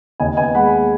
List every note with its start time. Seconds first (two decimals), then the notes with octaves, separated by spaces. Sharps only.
0.20 D#2 D#5 G#5
0.37 B3 D#5 G#5
0.55 G#3 F#5 B5